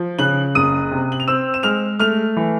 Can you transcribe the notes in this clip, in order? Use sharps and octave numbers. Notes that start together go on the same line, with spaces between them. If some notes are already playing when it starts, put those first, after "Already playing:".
Already playing: F3
C#3 F#6 F#7
F#1 D#6 D#7
C3
F#7
F7
C4 E6 E7
E7
G#3 F6 F7
A3 F6 F7
E3